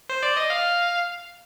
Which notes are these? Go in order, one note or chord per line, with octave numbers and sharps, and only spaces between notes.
C5
D5
D#5
F5